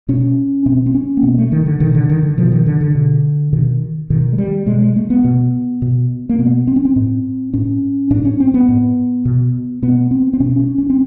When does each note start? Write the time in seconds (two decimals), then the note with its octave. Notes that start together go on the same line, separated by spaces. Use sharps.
0.08 B2 C#4
0.66 B2 C4
0.86 C4
0.95 C#4
1.17 A#3
1.23 B2 B3
1.38 A3
1.52 D#3
1.66 D3
1.80 B2 D#3
1.95 D3
2.09 D#3
2.23 D3
2.38 B2 F3
2.52 D#3
2.66 D3
2.81 D3
2.95 B2
3.53 B2 D#3
4.10 B2 D#3
4.33 G#3
4.38 G3
4.66 B2 G#3
4.81 G#3
4.96 A3
5.10 B3
5.24 B2
5.82 B2
6.29 A#3
6.39 B2 B3
6.67 C4
6.76 C#4
6.85 C4
6.96 A2
7.54 A2 C#4
8.10 A2 D4
8.25 C#4
8.40 C4
8.54 B3
8.68 A2
9.25 B2
9.82 B2 B3
10.11 C4
10.33 C4
10.40 B2 C#4
10.59 C#4
10.78 C#4
10.90 C4